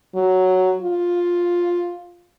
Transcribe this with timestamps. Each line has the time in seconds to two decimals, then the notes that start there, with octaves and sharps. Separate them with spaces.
0.15 F#3
0.82 F4